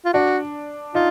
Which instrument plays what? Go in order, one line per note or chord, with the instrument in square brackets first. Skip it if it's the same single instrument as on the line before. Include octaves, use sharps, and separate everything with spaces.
[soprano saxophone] F4
[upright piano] D4 [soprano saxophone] F#4
[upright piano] D#4 [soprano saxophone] F4